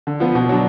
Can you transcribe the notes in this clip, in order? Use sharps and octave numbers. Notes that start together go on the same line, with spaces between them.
D3
F3 B3
B2
F#3 D4